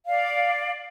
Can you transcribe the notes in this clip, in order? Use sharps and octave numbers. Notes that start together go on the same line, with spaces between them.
D5 F5